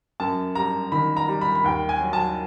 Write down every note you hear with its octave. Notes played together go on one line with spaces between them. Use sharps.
F#2 A5
G3 A#5
D#3 B5
A#5
G3
B5
B5
D#2 G5
G#5
F#3
A5